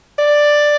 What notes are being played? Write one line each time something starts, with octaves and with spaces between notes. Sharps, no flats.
D5